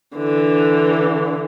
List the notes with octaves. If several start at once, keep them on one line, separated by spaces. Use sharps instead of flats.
D3 E3